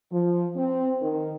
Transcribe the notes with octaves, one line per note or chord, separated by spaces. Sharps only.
F3
C4
D#3